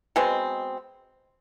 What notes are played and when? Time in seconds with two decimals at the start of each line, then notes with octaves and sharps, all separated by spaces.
0.16 B2 G#3 C4